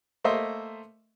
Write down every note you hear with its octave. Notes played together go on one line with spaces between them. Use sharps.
A3 A#3 C5 D#5 E5 C6